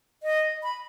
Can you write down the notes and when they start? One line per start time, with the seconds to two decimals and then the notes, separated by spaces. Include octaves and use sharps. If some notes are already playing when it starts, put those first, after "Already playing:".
0.23 D#5
0.63 B5